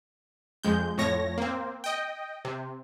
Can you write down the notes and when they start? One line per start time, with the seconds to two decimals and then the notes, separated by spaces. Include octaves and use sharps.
0.63 F2 G#3 G6
0.98 F2 A2 C#5 A#6
1.38 A#3 C4
1.84 D#5 G5
2.45 C3